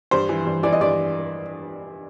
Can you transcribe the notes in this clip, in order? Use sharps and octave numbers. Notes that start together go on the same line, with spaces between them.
G2 C5
E3
G2
E3 D5
D#5
G2 D5